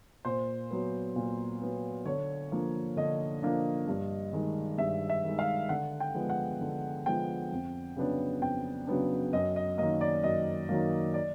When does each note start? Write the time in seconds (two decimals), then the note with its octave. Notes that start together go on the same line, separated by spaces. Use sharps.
0.25 A#2 C5
0.71 F#3 B3
1.16 A#2
1.61 F#3 B3
2.06 D3 C#5
2.52 F3 A#3 D4
2.96 D3 D#5
3.42 F3 A#3 D4
3.88 G2
4.33 D#3 G#3
4.78 G2 E5
5.10 E5
5.24 D#3 G#3
5.39 F5
5.69 D3 F#5
6.00 G5
6.15 F3 G#3 B3
6.29 F#5
6.61 D3
7.06 F3 G#3 B3 G5
7.51 F2
7.96 C#3 F#3 B3 D4
8.42 F2 G5
8.87 C#3 F#3 B3 D4
9.33 F#2 D#5
9.56 D#5
9.78 D#3 F#3 A#3 D#5
10.01 D5
10.23 F#2 D#5
10.69 D#3 F#3 A#3
11.14 D5